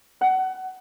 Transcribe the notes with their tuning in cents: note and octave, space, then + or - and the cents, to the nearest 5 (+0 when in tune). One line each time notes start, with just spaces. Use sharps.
F#5 +20